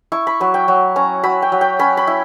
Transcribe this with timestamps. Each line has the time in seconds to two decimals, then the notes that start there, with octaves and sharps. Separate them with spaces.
0.12 E4 C#6
0.27 B5
0.40 F#3 B5
0.54 G5
0.68 F#3
0.96 C#4 A#5
1.24 F#3 B5
1.42 G5
1.52 F#3
1.61 G5
1.79 C#4 B5
1.97 B5
2.07 E4